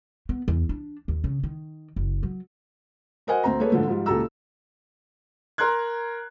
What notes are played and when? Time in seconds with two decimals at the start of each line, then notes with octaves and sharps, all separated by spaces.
0.29 B3
0.48 E2
0.69 D4
1.08 D#2
1.24 C#3
1.43 D#3
1.96 F#1
2.23 F#3
3.27 F#4 A#4 C5 D#5 F#5 G#5
3.44 D2 C4 A#5
3.60 A3 A#3 G#4 A4 B4 C#5
3.72 G#2 D3 F3 A3
3.88 G#2 F3 G3
4.06 C#2 A#2 G4 A4 A#5 E6
5.58 A#4 A#5 C6 F#6 G#6